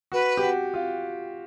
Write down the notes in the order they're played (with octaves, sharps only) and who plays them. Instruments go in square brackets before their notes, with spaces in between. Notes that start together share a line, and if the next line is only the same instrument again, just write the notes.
[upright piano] F#4 [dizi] B4
[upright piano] G4
F#4
F4